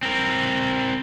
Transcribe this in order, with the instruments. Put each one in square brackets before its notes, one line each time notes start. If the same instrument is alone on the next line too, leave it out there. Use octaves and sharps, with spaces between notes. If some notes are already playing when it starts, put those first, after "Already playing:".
[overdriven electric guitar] C4 A#4